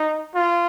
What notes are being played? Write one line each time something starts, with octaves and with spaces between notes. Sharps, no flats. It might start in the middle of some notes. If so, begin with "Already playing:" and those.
Already playing: D#4
F4